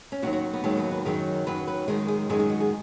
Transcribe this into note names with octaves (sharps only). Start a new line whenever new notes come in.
C#4
D#2 D#3 F#3 F#4
F#4
B3
D#2 D#3 F#3 G#3
B3
B4
F#2 D#3 F#3 G#4
F#2 D#3 F#3 B4
B4
F#2 D#3 G#3 G#4
G#4
F#2 D#3 G#3 G#4
G#4
F#4
G#4